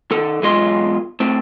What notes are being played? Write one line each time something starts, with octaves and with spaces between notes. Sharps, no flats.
D#3 A4
B1 E2 G#3 F4 D#5 C6
A2 C4